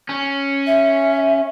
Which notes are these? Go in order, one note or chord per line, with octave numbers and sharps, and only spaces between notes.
C#4
E5